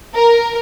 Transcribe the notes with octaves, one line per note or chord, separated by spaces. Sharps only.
A#4